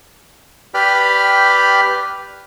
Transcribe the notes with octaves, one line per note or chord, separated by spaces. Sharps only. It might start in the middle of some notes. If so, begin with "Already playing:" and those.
G4 B4 D5 G5 B5 F6